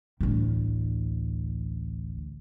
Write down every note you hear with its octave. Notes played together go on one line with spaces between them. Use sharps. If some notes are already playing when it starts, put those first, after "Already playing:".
A1 D2